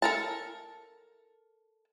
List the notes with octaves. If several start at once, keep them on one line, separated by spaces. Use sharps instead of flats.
A4 A#4 A5